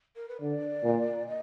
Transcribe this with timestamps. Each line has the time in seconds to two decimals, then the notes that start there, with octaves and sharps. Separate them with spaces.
0.16 A#4
0.29 B4
0.41 D3 D5
0.84 A#2
1.27 D#5